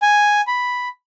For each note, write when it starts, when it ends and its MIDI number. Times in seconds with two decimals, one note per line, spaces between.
0.02 0.41 80
0.47 0.88 83